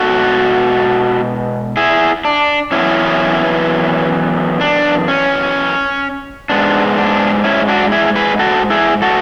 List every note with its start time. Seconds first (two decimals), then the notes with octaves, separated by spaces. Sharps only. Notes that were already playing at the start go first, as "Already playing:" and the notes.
Already playing: B2 G#3 B3 F#4 A4
1.77 E4 G#4
2.25 D4
2.72 F#2 E3 B3 C#4 E4
4.61 D4
5.08 C#4
6.50 G#2 G#3 B3 D4
6.97 D4
7.44 C#4 E4
7.68 D4 F#4
7.92 E4 G#4
8.15 G#4 B4
8.39 F#4 A4
8.70 E4 G#4
9.02 F#4 A4